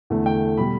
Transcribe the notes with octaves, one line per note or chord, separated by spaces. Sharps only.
E2 D3 A3
G5
B2 G3 B5